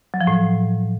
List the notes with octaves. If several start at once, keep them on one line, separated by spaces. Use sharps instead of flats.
F#3
F3
A2